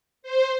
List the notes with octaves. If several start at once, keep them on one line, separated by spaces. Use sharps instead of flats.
C5